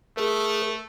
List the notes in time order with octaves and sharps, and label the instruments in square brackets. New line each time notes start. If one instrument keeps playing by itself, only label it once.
[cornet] A3 [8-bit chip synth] G#4 A#4